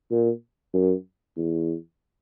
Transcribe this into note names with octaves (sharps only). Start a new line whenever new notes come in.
A#2
F#2
E2